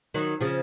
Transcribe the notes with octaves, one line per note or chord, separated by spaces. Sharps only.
D#3 F#3
C#3 F3